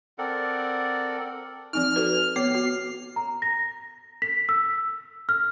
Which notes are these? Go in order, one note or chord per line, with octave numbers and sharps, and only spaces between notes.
C4 A4 A#4 D5 F#5
F3 C4 D#4 F6
F#4 A4 B4
B3 C#5 D6 C7
B3 F#4
A#5
A#6
B6
E6
F6